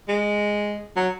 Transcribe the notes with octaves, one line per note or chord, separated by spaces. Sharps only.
G#3
F#3